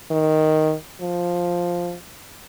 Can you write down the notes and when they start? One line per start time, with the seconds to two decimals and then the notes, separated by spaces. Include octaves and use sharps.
0.11 D#3
1.01 F3